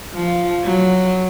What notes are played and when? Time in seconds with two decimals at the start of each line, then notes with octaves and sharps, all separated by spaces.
0.14 F3
0.64 F#3